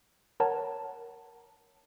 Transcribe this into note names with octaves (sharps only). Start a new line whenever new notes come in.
A#4 C#5 F#5 A5 A#5